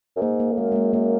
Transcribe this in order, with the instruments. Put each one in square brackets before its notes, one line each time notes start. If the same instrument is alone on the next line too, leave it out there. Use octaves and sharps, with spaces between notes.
[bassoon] F#2
[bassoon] G#2 [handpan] A#3
[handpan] A#3
[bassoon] F2
[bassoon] F#2 [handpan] G#3
[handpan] G#3
A#3
[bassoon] F#2 [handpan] A#3